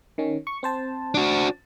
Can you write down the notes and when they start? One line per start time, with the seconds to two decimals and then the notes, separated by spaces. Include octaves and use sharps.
0.18 D#3 C#4
0.47 C#6
0.63 C4 C5 A5
1.14 D4 F#4